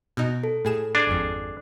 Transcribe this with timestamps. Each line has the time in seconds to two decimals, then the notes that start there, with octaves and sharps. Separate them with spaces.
0.17 B2 D#4
0.44 A4
0.65 A2 G#4 E7
0.95 D4 G#4
1.07 G#1 F2